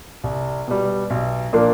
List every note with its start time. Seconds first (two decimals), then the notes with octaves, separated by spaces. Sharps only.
0.24 C2
0.68 B2 G3
1.10 B1
1.53 A#2 F3 A#3 D4